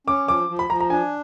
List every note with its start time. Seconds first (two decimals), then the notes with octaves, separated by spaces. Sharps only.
0.07 C#4 D6
0.27 F3 D6
0.49 F3
0.59 B5
0.70 F3 A#5
0.80 A#5
0.90 D4 G#5